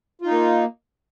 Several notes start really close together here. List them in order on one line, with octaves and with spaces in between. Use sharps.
F4 D#4 A#3